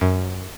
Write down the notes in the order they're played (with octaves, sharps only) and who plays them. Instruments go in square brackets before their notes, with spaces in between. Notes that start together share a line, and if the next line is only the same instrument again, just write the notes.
[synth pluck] F#2